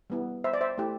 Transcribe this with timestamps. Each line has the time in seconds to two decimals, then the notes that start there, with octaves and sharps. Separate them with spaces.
0.10 G3 B3 E4
0.44 C5 E5
0.53 D5
0.61 C5 E5
0.78 A3 E4 G4